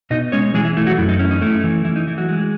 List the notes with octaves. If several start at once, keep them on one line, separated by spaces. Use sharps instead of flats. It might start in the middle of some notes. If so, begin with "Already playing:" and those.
B2 D#4 D#5
G#3 C#4 C#5
E3 G#3 G#4
E4
A3 E4
F#3 F#4
F#2 E4
D#4
C#4 E4
D#4
A3 E4
E3
E3 E4
D#4
E3 E4
F#3 F#4
G#3